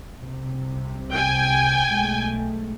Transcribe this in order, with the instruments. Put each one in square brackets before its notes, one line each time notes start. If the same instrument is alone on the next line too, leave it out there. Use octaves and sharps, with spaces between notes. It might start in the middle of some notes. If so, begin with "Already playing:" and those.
[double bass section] C2 C3
[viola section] G5 G#5
[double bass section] B1 G#3 A3